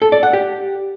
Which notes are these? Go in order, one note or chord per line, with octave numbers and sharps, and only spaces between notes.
A4
D5
F#5
G4